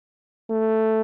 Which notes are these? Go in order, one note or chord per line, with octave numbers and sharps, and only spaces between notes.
A3